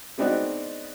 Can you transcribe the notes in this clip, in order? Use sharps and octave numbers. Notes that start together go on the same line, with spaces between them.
G#3 B3 C4 D4 D#4 F#4